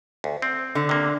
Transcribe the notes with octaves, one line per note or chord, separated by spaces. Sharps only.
D2
C4
D3
C3 A#3